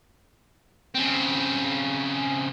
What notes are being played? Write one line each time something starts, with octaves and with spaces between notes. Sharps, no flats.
C#3 C4